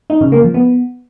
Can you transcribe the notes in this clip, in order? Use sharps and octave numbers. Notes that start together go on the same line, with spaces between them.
D#4
C#3
A#3
F3
B3